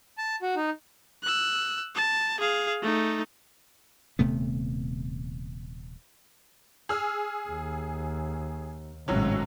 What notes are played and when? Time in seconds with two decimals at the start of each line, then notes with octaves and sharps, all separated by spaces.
0.18 A5
0.42 F#4
0.56 D#4
1.23 E6 F#6
1.95 A5
2.40 G#4 F5
2.82 A3 D#4
4.19 D#1 C3 A3 B3
6.89 G#4 E6 F6
7.49 D#2
9.08 G#1 A2 C3 F#3 C#4